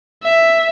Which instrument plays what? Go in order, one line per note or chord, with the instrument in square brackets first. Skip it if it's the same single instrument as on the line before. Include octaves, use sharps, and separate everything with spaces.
[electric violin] E5